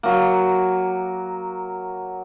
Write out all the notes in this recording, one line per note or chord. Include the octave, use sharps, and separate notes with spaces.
F#3 A#3